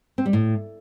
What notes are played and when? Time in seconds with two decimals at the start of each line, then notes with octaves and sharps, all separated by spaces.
0.18 C4
0.26 G3
0.33 A2